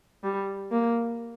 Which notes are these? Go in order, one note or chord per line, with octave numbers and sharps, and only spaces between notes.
G3
A#3